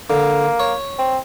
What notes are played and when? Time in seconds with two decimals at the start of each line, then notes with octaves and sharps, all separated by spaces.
0.10 D3 A#3
0.60 C#5
0.99 C4